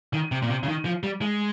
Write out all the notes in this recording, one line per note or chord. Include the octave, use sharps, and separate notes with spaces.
D#3
C3
A#2
C3
C#3
D#3
F3
G3
G#3